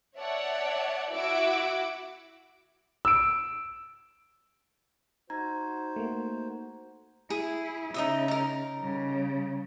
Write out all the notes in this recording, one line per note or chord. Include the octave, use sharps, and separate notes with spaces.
C#5 D5 E5 F#5 A5
E4 F#4 E5 F#5 D6 E6
E6 D7
D#4 F#4 C5 A#5 G#6
A3 A#3
E4 G#4
C#3 D#4 D#5 E5
D#4 A#4
C#3 G3